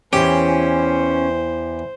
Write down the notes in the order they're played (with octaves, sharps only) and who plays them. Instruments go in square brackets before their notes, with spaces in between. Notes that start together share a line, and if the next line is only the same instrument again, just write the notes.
[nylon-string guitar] E2 E3 [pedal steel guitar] C#4 [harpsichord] G4 [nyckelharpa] C5